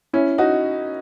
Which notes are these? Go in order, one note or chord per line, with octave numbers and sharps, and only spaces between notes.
C#4 E4
D#4 F#4